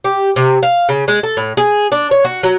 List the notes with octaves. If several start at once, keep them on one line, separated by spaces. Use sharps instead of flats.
G4
C3
F5
C#3
G#3
A4
A2
G#4
D4
C#5
F#4
F#3